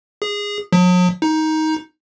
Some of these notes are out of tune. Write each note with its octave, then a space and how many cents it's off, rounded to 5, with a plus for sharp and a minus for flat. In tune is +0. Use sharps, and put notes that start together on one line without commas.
G#4 -15
F#3 -45
D#4 +15